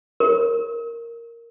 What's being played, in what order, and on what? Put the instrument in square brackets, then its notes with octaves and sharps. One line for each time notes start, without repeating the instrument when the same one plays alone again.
[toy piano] A#4